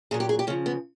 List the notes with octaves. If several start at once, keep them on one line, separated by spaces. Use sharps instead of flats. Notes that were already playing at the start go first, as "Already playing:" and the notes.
A#2 F#3 G#4
G4
G#4
G4
C#3 F3 C#4
B3